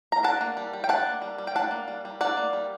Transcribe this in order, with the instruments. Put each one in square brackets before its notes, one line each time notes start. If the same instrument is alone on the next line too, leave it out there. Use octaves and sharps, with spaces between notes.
[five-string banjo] A#5
D4 F#5 A5
A#3
G3
G3
G5
D4 F#5 A5
A#3
G3
G3
G5
D4 F#5 A5
A#3
G3
G3
D4 D5 F#5
A#3
G3